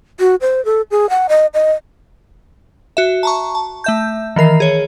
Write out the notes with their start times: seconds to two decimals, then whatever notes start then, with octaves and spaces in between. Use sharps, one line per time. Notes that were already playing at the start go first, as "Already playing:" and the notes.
0.20 F#4
0.41 C5
0.65 A4
0.91 G#4
1.10 F#5
1.29 D#5
1.54 D#5
2.97 F#4 E5
3.23 A5 A#5 C#6
3.55 A5
3.84 A3 E5 G6
4.36 D#3 E3 A#4 C7
4.60 G#4 C#5